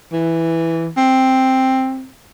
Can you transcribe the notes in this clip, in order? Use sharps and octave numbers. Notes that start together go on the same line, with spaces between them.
E3
C4